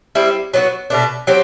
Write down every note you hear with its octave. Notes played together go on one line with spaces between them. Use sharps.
G3 C4 E4
F#3 B3 D4 F#4
B2 A3 D4
F#3 C4 G4